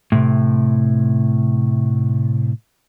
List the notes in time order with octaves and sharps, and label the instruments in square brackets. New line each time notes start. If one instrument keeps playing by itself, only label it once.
[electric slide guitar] A2 C3